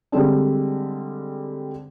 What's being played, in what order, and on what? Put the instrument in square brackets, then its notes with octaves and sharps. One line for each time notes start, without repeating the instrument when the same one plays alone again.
[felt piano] D3 G3 G#3 C4 D4